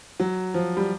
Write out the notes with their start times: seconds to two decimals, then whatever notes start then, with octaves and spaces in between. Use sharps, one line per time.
0.20 F#3
0.54 F3
0.77 G3